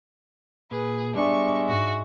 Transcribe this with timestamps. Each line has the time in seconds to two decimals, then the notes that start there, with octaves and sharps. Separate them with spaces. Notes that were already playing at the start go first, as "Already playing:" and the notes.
0.71 A#2 G#4 B4
1.15 G3 G#3 B3 D4 E5 C#6
1.68 G#2 F#4